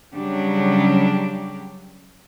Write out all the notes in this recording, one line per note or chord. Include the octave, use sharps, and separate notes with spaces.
C#3 F#3 G3 D4 G4